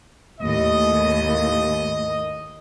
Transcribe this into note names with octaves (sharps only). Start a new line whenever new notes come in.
D#2 A2 D#5